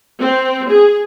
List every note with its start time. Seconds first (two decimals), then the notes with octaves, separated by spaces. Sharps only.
0.20 C4
0.70 G#4